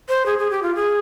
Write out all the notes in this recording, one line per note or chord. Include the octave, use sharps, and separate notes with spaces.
C5
G#4
G#4
G4
F4
G#4